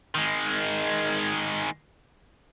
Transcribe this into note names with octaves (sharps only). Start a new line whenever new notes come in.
D#3 G#3